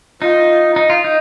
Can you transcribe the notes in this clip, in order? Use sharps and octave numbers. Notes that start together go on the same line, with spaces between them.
D#4 F4
D#4
F4
D#4